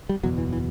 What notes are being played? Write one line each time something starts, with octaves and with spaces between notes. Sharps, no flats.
G3
F#1 E2 B2 F#3
E3
E3